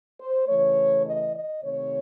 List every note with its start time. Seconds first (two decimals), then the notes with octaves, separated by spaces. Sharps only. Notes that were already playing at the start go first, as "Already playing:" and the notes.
0.19 C5
0.47 C#3 E3 A3 C#5
1.05 D#5
1.33 D#5
1.62 C3 D#3 A3 C4 C#5